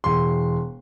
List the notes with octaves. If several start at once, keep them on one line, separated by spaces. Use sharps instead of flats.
E1 C6